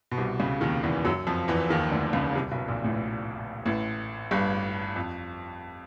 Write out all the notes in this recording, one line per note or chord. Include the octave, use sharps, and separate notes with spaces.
B2
C2 C3
C#2 C#3
D#2 D#3
E2 E3
F#2 F#3
F2 F3
E2 E3
D#2 D#3
D2 D3
C#2 C#3
C2 C3
B1 B2
A#1 A#2
A1 A2
A1 A2
G1 G2
F2